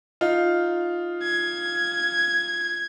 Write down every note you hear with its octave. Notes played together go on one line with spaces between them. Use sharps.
D#4 F4
G#6